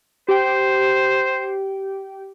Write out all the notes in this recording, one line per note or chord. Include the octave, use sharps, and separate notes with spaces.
G4 C5 G5